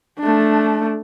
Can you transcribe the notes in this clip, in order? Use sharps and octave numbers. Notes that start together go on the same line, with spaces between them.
A3 D4